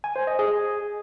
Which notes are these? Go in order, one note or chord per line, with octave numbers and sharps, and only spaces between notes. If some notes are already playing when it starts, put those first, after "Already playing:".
G#5
C5
D#5
G#4